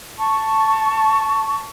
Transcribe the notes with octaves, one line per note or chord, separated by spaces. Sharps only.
A5 C#6